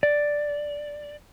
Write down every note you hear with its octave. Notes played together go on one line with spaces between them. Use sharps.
D5